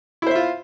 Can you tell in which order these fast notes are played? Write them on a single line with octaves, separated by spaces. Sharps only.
E4 C5 E5 F4